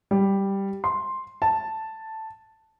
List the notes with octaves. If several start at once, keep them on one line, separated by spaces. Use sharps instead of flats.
G3
C6
A5